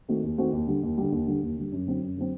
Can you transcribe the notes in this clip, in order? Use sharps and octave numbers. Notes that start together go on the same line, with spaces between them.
D#3 A3 C4 F#4
D#2
D#3 A3 C4 F#4
D#2
D3 G3
D#2
D3 G3
D#2
D3 G3
D#2
D3 G3
F#2
D3 F#3 C4
F#2
D3 F#3 C4